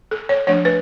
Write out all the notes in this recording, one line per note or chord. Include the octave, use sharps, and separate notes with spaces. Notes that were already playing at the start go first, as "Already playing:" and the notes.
A4
C#5
F3 A3 D4 C#5
B4